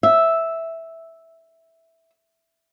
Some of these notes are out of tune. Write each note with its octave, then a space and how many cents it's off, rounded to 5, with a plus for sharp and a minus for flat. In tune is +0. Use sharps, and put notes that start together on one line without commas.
E5 -5